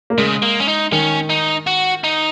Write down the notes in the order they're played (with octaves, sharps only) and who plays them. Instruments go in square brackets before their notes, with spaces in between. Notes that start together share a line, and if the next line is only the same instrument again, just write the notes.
[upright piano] A#3
[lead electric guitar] C#3 [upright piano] G#3
[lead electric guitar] A#3
C#4
D#4
[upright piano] D#3 [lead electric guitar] C#4
[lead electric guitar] D#4
F#4
D#4